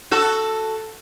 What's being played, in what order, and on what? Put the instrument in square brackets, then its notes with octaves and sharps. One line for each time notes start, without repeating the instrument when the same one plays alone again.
[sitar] F#4 A4